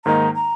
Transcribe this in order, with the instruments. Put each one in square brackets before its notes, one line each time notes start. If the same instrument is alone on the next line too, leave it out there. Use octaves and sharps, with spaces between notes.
[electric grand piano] G#2 D#3 A#3 D#4 [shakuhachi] A#5
[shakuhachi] A#5